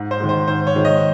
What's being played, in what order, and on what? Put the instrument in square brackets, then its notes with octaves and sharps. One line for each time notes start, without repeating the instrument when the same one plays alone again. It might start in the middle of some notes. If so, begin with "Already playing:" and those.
Already playing: [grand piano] G#2
C5
D#3 G#3
C5
G#2 C5
C#5
D#3 G#3
D#5